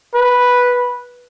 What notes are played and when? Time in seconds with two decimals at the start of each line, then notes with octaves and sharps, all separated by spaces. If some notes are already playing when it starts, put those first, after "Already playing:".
0.15 B4